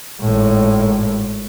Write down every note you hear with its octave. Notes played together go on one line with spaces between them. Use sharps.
G#1 A2